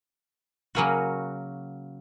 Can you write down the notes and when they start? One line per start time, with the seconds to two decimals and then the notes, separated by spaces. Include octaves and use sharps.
0.75 C#3 F#3 A#3 C#4 F#4